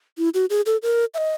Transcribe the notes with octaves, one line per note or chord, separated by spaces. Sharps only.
E4
F#4
G#4
A4
A#4
E5
D#5